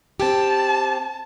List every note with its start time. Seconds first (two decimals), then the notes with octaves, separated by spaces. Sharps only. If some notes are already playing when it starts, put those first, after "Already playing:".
0.20 C4 G4 A5